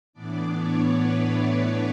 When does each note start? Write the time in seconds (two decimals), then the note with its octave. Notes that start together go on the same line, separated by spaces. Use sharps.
0.13 A2 E3 B3 D4 D5
0.54 C#5
0.94 B4
1.34 C#5